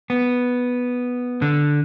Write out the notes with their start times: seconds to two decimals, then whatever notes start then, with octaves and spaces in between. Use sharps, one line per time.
0.10 B3
1.42 D3